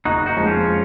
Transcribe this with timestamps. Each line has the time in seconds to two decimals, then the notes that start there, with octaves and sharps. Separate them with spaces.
0.05 F#1 D#4 F#4
0.26 D#4 F#4
0.36 F2 F3 G#3
0.47 C#4 F4